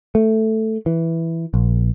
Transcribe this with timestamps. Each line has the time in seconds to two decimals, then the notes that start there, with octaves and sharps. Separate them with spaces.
0.15 A3
0.86 E3
1.54 A#1